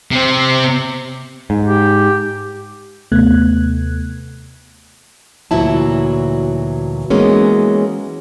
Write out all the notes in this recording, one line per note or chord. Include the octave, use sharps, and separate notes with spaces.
C3 C4
G#2
G4
D#2 C3 A3 B3 F#6 G#6
D2 A#2 E3 F#3 E4 A5
E3 F#3 G#3 A#3 B3 C#4